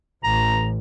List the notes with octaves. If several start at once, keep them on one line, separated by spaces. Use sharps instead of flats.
A1 A#5